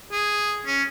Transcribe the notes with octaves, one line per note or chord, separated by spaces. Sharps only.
G#4
C#4